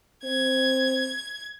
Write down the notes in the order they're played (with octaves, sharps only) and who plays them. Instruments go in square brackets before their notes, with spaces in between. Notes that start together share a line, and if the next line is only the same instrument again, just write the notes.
[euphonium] C4 [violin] G#6